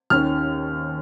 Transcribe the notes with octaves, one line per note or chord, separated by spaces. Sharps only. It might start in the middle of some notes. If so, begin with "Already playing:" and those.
D#2 D#3 C#4 F6